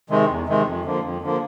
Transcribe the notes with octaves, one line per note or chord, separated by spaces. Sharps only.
C3 D#3 G#3
E2
C3 D#3 G#3
F2
D3 F3 A#3
F2
D3 F3 A#3